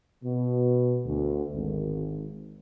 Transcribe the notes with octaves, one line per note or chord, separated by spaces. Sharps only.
B2
D2
G#1